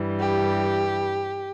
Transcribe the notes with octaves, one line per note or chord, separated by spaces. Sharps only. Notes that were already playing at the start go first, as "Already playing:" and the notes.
Already playing: G2 E3 G3
G4